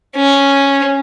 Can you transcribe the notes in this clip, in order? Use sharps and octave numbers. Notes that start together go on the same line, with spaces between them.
C#4